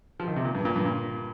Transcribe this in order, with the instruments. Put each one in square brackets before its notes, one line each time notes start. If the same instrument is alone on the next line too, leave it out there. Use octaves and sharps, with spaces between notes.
[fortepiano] F3
D#3
C3
A#2
G2
A#2
G2
A#2